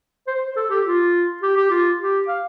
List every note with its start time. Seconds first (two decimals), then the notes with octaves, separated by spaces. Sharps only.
0.27 C5
0.47 C5
0.56 A4
0.70 G4
0.86 F4
1.42 G4
1.56 G4
1.71 F4
2.00 G4
2.28 F5